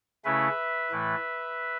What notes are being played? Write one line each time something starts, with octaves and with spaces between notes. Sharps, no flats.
C#3 A3 C#4 E4 B4 E5
A2 E3 A3 E4